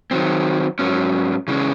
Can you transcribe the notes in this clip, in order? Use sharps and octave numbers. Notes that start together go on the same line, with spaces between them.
D#3 F#3 C4
G#2 F#3 C#4
C#3 E3 G#3 C#4